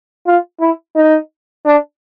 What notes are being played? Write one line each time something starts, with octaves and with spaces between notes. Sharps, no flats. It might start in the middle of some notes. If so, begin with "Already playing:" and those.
F4
E4
D#4
D4